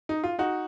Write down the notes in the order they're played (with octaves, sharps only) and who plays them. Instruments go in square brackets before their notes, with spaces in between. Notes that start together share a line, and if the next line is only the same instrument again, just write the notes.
[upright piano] D#4
F4
D#4 F#4